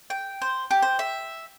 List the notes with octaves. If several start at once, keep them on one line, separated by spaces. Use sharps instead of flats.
G5
C5
G4
C5
E5